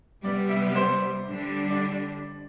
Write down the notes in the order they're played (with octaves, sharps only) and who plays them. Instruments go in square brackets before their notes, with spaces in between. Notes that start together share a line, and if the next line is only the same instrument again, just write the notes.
[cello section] C3 G3 B3 [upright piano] D5
[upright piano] E5
C5
[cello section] D3 G3 D4
[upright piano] D5